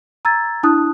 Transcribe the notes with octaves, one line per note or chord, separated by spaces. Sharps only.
A#5 E6 G#6 A6
D4 E4 A5 D#6 F#6